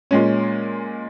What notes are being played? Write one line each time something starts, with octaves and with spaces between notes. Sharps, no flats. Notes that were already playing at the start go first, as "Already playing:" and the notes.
A#2 G#3 C#4